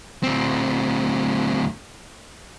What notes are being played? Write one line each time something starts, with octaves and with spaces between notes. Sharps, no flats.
D2 C4